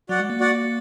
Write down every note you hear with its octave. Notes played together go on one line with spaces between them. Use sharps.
F#3 F#4 D5 F#5
G#3
A#3
F#4 D5 F#5